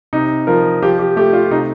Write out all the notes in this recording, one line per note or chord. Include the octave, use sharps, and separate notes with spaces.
C3 D#4
F3 A#4
F3 G4
G4
A3 G4
F4
C3 D#4